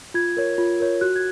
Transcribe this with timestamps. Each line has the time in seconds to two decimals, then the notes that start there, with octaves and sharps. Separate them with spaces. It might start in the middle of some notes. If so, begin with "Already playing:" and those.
0.14 F4 G#6
0.37 A#4 C#5
0.58 F4
0.80 A#4 C#5
1.01 F#4 F#6
1.16 G#6